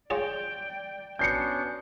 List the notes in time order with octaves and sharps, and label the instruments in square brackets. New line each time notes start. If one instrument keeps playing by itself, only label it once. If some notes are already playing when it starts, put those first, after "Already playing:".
[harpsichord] F4 G#4 C#5 [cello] D5 G5
[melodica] B3 C#4 D4 [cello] F#4 [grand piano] G6 C7 C#7